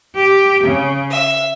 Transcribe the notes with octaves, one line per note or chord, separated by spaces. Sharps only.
G4
C#3
E5